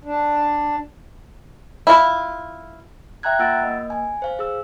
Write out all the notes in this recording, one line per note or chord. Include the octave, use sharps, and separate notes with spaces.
D4
E4 F4
E5 G5 A#5 F#6 G#6
A#3 F4 F#5 E6 A6 D7
A#3 D#5
G#5
C5 F5
G#4 E6